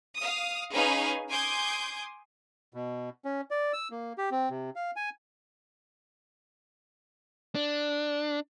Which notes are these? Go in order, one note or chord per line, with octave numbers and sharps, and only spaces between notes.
F5 D#6
C#4 D#4 G#4 B4 F5 G#5
G#5 C6 D6 D#6 G6 G#6
B2
C#4
D5
E6
A#3
G4
C4
C3
F5
G#5
D4